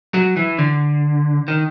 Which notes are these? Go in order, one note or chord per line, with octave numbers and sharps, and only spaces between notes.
F#3
E3
D3
D#3